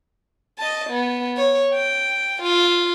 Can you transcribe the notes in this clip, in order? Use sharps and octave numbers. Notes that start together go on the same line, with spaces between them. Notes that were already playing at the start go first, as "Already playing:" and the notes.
D#5 A5
B3
C#5
G5
F4